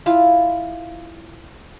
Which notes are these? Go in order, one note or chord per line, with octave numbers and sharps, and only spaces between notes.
E4 F4 F5